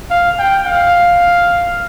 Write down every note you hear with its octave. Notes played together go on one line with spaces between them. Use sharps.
F5
G5
F5